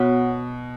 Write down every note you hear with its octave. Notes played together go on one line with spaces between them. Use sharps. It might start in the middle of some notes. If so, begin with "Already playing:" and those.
Already playing: B2 B3 F#4 C#5 F#5